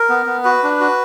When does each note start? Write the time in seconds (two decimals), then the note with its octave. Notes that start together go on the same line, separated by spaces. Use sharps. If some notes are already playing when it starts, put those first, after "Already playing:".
Already playing: A#4
0.09 B3
0.26 B3
0.44 F#4 B4
0.63 D4
0.80 F#4